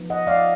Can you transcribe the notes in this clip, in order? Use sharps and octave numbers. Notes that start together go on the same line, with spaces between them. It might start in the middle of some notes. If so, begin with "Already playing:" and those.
Already playing: F3 B3 D#4
D#5 F#5
D5 F5